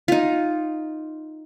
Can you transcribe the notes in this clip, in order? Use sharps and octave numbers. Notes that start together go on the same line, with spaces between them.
D#4 F4